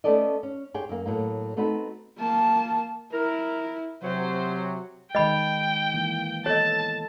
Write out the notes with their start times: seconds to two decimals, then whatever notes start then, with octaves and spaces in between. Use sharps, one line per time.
0.04 A3 B3 C#4 A4 D5 D#5
0.43 C#4
0.74 G4 G#4 C5 C#5 G5
0.89 F#2 A#3
1.06 A2 F#3 A#3
1.57 A3 B3 C4 D#4 F#4 B4
2.18 A#3 A5
3.13 E4 A#4
4.03 C3 F#3 C5
5.15 D#3 G#3 D#5 G5 B5
5.94 E3 A#3
6.46 B3 A4 C#5 D#5 A5